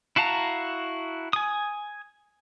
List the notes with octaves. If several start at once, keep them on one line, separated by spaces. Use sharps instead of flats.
E4 F#4 F5 A5 A#5
G#5 D#6